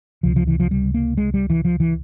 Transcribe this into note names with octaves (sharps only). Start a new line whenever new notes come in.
C#2 C3 F3
F3
E3
F3
G3
A#3
G#3
G3
E3
F3
E3